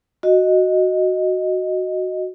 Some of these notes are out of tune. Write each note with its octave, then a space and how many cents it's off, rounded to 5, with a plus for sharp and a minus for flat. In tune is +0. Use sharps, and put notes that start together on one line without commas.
F#4 +0 D#5 +0